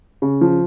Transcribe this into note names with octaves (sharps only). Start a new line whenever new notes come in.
C#3
F3